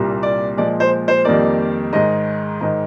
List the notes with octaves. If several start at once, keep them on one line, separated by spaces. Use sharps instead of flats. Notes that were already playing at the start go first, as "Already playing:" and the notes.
Already playing: C2 A#2 G3 A#3
D5
A#2 F3 G#3 D5
C5
C5
F2 D#3 G3 A#3 D5
G#2 D#3 G#3 D#5
G#2 D#3 G#3